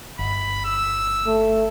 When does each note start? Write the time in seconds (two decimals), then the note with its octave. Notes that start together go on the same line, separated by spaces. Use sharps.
0.19 G1 B5
0.65 E6
1.26 A3